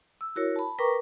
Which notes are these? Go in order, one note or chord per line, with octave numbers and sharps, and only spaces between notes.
E6
E4 F#4 A#4 C#5
A5 B5
A#4 B4 G5 A#5 C#6 D6